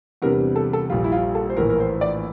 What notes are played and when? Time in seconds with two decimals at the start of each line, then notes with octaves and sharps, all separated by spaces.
0.22 E2 C3 G3 D4 A#4
0.56 A4
0.73 A4
0.90 A#1 A#2 G3 F4
1.04 E4
1.12 F4
1.35 A4
1.50 C5
1.57 A#1 A2 E3 A#4
1.70 A#4
1.80 C5
2.01 D5